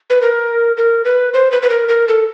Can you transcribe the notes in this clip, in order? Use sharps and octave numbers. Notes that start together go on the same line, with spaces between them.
B4
A#4
A#4
B4
C5
B4
B4
A#4
A#4
A4